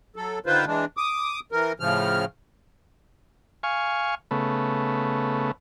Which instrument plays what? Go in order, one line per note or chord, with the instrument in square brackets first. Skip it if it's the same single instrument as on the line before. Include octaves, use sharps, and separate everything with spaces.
[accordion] F#3 A4
D3 D#3 F4 B4 C5
E3 G#3 D4
D6 D#6
E3 A#4
A2 C#3 F3 F6
[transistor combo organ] F5 G#5 C#6
C#3 A3 B3